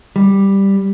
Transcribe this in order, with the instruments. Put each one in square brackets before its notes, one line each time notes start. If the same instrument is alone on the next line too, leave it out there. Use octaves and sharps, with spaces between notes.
[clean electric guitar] G3